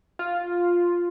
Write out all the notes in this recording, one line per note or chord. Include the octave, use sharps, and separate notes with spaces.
F4